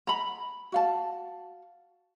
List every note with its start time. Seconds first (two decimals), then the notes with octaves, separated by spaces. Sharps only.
0.07 A#5 B5
0.72 F#4 F5 A5